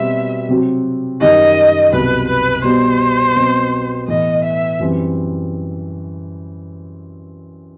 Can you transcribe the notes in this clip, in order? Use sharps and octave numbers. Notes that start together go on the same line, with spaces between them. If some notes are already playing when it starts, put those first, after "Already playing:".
Already playing: B2 G3 C4 F#4 E5
C3 F#3 C4 F#4
F#2 D#3 G3 D#4 G4 D#5
C2 B2 F#3 B4
B4
B2 G3 B3 C5
B2 F#3 C4
A2 E3 B3 D#5
E5
F#2 E3 G3 C4